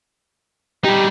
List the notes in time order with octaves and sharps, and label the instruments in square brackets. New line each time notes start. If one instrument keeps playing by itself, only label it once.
[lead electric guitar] G3 D#4 [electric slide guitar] G4